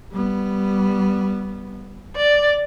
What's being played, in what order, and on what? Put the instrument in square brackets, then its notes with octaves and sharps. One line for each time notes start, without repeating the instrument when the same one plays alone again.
[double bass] G3 B3
[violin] D5